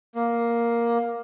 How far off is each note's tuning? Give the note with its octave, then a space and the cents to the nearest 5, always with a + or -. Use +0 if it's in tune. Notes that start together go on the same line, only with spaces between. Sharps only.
A#3 +5